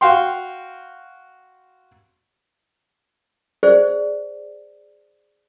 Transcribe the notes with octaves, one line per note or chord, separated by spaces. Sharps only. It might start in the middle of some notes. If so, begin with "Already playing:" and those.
F#4 F5 G5 C6
G#4 C5 D5